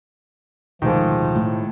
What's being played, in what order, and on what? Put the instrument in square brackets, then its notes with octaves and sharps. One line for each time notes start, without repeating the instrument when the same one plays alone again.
[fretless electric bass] D1 B2 A3 [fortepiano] G#2 D#3 [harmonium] F3
[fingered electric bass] A2